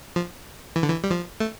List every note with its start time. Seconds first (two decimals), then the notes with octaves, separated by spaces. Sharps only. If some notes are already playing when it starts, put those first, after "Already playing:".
0.16 F3
0.76 E3
0.83 D3
0.90 E3
1.04 G3
1.10 F3
1.40 A3